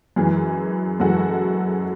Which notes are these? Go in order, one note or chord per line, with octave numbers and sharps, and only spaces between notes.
F#2 E3 G#3 G#4
F#2 E3 G#3 F#4 A4